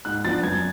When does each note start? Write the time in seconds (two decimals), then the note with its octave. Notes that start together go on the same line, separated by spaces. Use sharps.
0.05 G#2 F#6
0.24 F3 B3 D4 A6
0.43 F#2 G#6